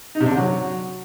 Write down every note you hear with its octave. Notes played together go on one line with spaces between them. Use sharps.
D#4
C3
D4
D3
F#3